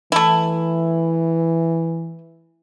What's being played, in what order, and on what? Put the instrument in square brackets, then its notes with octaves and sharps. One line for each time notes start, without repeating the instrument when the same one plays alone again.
[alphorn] E3 [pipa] A3 E4